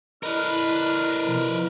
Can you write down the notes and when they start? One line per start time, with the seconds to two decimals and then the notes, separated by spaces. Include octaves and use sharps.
0.23 D4 E4 A#4 B4 D#5 F6
1.22 B2 E3 F3